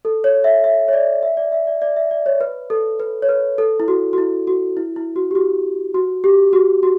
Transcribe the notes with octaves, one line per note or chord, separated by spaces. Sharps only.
A4
C#5
E5
E5
C#5
D5
E5
D5
E5
D5
D5
E5
D5
C#5
B4
A4
B4
C#5
B4
A4
E4
F#4
F#4
E4
F#4
E4
E4
F#4
G4
F#4
F#4
G4
F#4
F#4